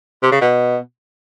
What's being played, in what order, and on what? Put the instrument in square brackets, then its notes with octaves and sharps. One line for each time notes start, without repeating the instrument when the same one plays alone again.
[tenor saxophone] C3
C#3
B2